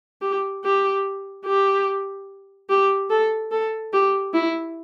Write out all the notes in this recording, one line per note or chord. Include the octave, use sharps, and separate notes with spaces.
G4
G4
G4
G4
A4
A4
G4
E4